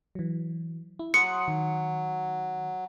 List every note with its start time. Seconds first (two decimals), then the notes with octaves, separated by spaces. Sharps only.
0.15 E3 F#3
0.99 E4
1.14 F#3 C6 D#6 F#6 C#7
1.48 D#3